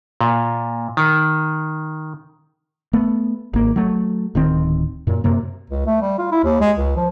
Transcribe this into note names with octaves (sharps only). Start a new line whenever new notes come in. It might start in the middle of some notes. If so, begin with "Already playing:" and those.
A#2
D#3
A3 B3
G#1 A#3
F#3 A3
D1 D#3 C4
F#2 A#2
F#2 C3 A#3
C#2
A3
G3
F4
E4
D#2
G#3
C#2
F3